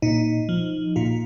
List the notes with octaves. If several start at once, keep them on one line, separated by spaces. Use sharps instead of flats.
A#2 D#4
F3
A#2 F4